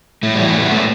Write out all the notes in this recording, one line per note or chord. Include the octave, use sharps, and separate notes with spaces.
A2 A3
G3
E3
A3
A2 G3 B3
A2 A3